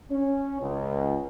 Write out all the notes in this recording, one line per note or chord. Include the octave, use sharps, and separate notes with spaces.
C#4
C#2